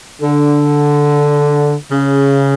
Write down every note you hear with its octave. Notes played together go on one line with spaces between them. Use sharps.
D3
C#3